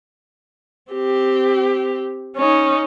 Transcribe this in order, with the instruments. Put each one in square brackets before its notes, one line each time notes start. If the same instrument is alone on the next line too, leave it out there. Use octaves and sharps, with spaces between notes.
[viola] C4 G4
C#4 D#4